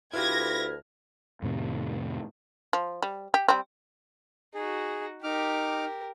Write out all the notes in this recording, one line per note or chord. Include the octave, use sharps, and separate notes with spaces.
D2 E4 F4 G4 B4 F6 G#6 A#6
F2 A2 C3 D#3
F3
G3
G4
G3 C4
D#4 F#4 G#4
D#4 G4 A#4 D6 F6